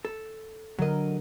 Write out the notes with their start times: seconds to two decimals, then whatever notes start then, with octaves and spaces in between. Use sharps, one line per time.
0.05 A4
0.79 D3 F#3 A#4 D#5